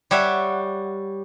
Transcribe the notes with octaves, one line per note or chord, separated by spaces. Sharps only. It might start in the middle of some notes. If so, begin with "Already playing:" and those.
G3 C#5 E5 F#5